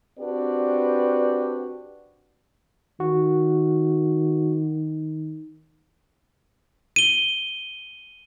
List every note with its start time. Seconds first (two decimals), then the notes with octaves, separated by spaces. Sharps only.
0.19 C4 D4 F#4 G4 B4 D5
3.00 D#3 F#4
6.96 D#7 G7